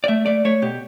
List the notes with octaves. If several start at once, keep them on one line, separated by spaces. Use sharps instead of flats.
D5
A3 E5
A3 D5
A3 C#5
B2 G4